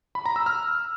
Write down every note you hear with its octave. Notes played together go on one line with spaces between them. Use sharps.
B5
A#5
E6
F6